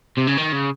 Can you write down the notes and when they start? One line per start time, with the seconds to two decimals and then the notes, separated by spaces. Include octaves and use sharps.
0.17 C3
0.27 C#3
0.37 D#3
0.52 C#3